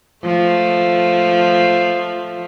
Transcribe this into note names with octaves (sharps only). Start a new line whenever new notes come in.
F3 A3